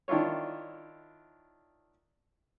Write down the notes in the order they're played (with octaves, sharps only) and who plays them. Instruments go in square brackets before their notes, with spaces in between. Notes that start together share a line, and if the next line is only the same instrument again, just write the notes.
[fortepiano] D#3 D4 E4 F4 C#5